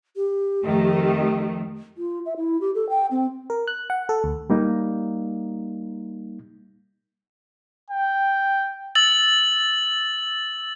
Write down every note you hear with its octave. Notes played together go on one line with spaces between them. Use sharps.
G4
F2 D#3 A3
F4
E5
E4
G4
A4
G5
C4
A#4
F#6
F#5
A4
D2
G3 A#3 D#4
G5
E6 A6 F#7